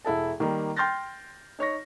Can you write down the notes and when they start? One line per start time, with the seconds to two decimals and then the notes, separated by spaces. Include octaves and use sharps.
0.05 E1 E4 A4 A5
0.40 D#3 G3 A#3
0.77 G5 C6 F6 G6 A6 A#6
1.59 D#4 C#5 C#6 A#6